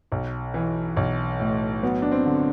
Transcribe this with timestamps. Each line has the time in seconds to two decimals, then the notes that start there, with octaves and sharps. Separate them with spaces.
0.12 B1
0.54 E3
0.97 B1
1.40 A2
1.83 F#3 B3
2.02 D4
2.12 C4
2.26 D3